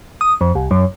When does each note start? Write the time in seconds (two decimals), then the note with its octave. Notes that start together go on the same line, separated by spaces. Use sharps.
0.21 D#6
0.41 F2
0.55 C2
0.71 F#2